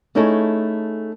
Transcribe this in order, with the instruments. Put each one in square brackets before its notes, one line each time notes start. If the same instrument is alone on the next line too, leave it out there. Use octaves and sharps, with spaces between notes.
[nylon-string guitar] A3 C#4 D#4 E4 G#4 A4